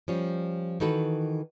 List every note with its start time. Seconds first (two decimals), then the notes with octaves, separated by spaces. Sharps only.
0.08 F3 G3 C#4
0.80 D#3 E3 D#4 F#4 A4 B4